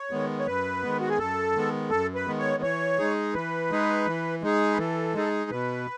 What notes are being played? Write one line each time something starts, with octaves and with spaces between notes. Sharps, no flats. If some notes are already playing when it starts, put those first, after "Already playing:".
Already playing: C#5
D#3 G#3 B3
C#5
F#2 B4
D#3 G#3 B3
F#4
G#4
F#2 A4
D#3 G#3 B3
F#2 A4
B4
D#3 G#3 B3
C#5
E3 C#5
G#3 D#4 G#4
E3 B4
G#3 D#4 G#4
E3
G#3 D#4 G#4
B4
E3 A4
G#3 D#4 G#4
B2 B4